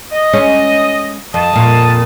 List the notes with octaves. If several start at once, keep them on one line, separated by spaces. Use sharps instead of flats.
D#5
G#3 C#4
F2 A5 D#6
F2 A#2